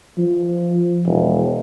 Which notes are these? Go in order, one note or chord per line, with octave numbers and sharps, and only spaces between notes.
F3
E1